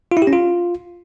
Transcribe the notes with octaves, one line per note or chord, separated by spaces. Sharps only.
F4
E4
G4
C#4
F4